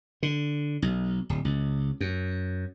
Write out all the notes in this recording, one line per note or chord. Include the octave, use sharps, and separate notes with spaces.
D3
B1
D1
C#2
F#2